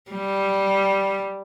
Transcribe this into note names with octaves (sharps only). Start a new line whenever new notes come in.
G3